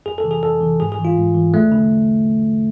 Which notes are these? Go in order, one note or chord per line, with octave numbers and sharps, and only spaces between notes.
F2 G#4
A4
C3 E3
G#4
F2 A4
C3 E3
G#2 G#4
G#4
E3
F4
G#2
E3
E2 A3
D3